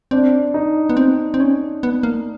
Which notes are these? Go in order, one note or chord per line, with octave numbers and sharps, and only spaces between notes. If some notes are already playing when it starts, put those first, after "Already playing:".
C4 D4
D#4
B3
C4
C4
C#4
B3
A#3